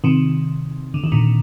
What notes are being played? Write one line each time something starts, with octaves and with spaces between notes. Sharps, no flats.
C3 D#3
D3
D#3
A#2 D3